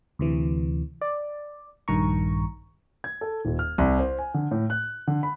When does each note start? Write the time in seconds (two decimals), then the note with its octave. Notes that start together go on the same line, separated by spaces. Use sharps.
0.19 D2 C3 E3
1.02 D5
1.88 A#1 G2 D#3 A#5 C#6
3.04 G#6
3.21 A4
3.45 D#1
3.59 F6
3.78 C2
3.99 C5
4.19 G#5
4.34 D3
4.51 A2
4.70 F#6
5.07 D3
5.23 B5